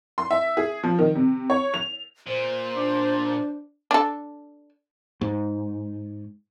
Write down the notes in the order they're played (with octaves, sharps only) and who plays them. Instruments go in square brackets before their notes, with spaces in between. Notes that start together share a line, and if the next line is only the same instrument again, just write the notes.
[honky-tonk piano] C6
E5
G#4
F3
D#3
C3
C#5
F7
[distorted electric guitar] A#2 [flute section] C5
[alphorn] D4 [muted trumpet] D5
[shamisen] D4 A4
[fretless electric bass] G#2